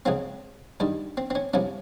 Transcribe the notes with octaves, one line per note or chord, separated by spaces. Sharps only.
C#2 C#3 F3 C4
G2 D#3 G3
C4
C4
C#4
C2 C3 F3 C#4